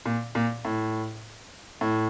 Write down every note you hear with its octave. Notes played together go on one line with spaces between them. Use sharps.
A#2
A#2
A2
A2